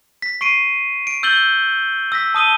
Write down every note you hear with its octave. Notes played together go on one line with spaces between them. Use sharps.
B6
C#6 C7 D7 D#7
D7
E6 G6 A6 F#7 G7
E6 A#6 B6
A5 D#6 D#7 G7